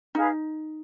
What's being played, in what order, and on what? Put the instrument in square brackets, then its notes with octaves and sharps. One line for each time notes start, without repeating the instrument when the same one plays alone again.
[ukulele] D#4 [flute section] G#4 B4 F5